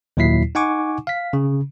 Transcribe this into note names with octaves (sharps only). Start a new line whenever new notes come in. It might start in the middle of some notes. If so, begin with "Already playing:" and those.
D#2 A#2 F#3 E4 B6 C7
D#4 F#5 G#5 C#6 D6
F5 B6
C#3